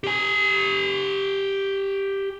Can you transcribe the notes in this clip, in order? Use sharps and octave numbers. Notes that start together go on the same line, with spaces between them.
G4 G#5